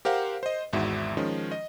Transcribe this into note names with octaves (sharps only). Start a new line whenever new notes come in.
G4 A#4 C5 F5 F#5
C5 D#5
G#1 E2 G#2 F#4 E5
D#3 F3 G#3 C#4
D#5